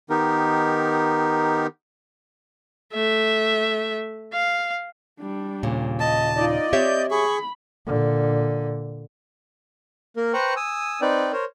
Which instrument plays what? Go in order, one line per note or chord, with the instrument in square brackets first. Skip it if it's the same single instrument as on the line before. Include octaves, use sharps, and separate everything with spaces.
[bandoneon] D#3 B3 D#4 G4 A#4
[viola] A3 E5
F5
[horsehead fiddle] G3 D4
[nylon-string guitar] D#2 A#2 C#3
[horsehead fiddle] D#5 [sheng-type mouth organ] A5
[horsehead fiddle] D#4 F4 [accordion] D5 D#5
[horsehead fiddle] C4 [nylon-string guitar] G4 C#5 E5 [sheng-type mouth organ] G6
[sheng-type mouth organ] G#4 [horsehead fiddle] B5 [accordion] C#6
[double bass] A#2 D3
[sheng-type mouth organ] A#3 A#4
B4 C5 G5 A#5 C#6 F#6
G#5 D#6 E6
C4 D#4 B4 D5 G5
A#4 C5 C#5